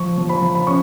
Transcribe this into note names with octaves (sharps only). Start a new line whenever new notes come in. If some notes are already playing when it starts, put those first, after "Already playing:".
Already playing: F3 C#6
F3
B5
F3
B5
C#4 C#6